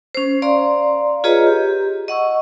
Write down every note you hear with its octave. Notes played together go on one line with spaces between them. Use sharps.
C#4 C5
D5 F5 A#5 C6
F4 G#4 B4 C#5 D#5 A#5
G4
D#5 F#5 C#6 E6